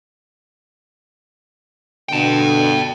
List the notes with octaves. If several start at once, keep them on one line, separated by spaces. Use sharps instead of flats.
B2 D3 G5 A5